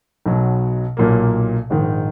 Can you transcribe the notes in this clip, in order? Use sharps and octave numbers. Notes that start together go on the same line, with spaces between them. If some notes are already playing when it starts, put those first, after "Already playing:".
B1 B2 F#3
B1 A#2 F#3 A#3
A#1 G#2 D#3